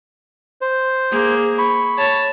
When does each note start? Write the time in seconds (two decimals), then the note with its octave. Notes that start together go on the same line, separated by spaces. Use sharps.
0.61 C5
1.11 A#3 G#4
1.58 B5 C#6
1.98 C#5 A5